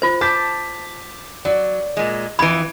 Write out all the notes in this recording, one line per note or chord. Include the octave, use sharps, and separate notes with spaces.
F4 C5
A5 D6 G6 B6
F#3 D5
A#2 G#3
F2 E3 B5 G#6 D7